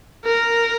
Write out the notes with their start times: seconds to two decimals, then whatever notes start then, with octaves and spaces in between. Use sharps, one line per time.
0.25 A#4